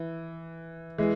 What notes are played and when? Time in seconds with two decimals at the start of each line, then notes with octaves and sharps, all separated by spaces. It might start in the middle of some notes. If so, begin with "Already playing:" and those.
Already playing: E3
0.98 E3 G#3